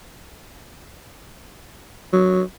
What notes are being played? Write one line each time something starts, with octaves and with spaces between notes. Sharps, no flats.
F#3